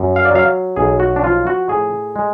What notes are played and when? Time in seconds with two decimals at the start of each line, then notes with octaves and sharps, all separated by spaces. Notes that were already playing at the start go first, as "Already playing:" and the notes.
Already playing: F#2
0.16 F5
0.25 D5
0.31 F#3 F5
0.76 B1 G#4
1.00 F#4
1.16 D4
1.23 F3 F4
1.47 F#4
1.69 A2 G#4
2.16 G#3